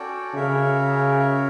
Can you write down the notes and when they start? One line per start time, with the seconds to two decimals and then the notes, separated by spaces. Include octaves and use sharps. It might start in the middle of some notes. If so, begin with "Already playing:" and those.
Already playing: C#4 F#4 A4 D5 G5
0.35 C#3 F#4 A#4 C#5 E5